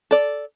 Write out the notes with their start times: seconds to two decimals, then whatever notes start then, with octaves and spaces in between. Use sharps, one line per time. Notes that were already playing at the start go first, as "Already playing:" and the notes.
0.11 A4 D5